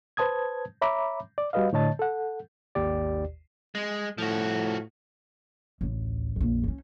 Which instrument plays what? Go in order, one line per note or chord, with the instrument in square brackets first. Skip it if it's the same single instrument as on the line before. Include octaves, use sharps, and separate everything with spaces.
[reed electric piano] B4 C5 A5 D#6 G#6
C#5 E5 A#5 B5 D6
D5
G3 F#4 B4 D#5 F5
A2 D3 C#5 D#5 A5 A6
A4 F#5
[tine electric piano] G#1 D#2 G4 D5
[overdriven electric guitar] G#3
[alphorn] A2 [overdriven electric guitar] F3 F#4
[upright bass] A1 D2
A#1 F2
G3 C#4